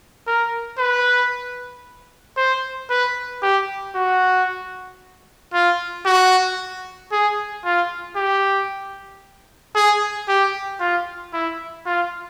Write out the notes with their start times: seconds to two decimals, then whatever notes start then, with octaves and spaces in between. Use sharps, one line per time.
0.27 A#4
0.79 B4
2.37 C5
2.90 B4
3.43 G4
3.96 F#4
5.54 F4
6.06 F#4
7.12 G#4
7.65 F4
8.17 G4
9.75 G#4
10.28 G4
10.80 F4
11.33 E4
11.86 F4